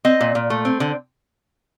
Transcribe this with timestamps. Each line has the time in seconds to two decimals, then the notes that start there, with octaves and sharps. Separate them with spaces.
0.05 C4 D#5
0.21 A#2
0.35 A#2
0.50 A3
0.65 C4
0.80 D3